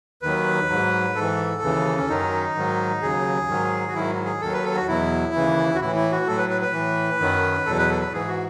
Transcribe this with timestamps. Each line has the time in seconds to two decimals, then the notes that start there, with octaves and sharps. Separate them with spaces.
0.22 D#2 D#3 F#3 B4
0.69 G#2 F#3
1.15 G#2 A4
1.21 E3
1.62 D#2 C#3 E3
1.97 C#4
2.08 F#2 D#3 F#3 D#4
2.55 G#2 D#3 F#3
3.02 D#2 C#3 F#3 G#4
3.48 G#2 D#3 F#3
3.88 F#4
3.94 G#2 D#3 F#3 E4
4.25 G#4
4.41 D#2 D#3 F#3 A4
4.53 B4
4.64 A4
4.75 F#4
4.88 E2 B2 F#3 E4
5.34 D#2 C#3 E3
5.75 F#4
5.80 A2 E3 E4
5.95 E4
6.12 F#4
6.27 A2 F#3 A4
6.38 B4
6.50 B4
6.61 B4
6.73 A2 E3
7.20 F#2 D#3 F#3
7.66 E2 B2 F#3 A4
7.78 B4
7.90 A4
8.01 B4
8.12 G#2 E3 G#4
8.28 F#4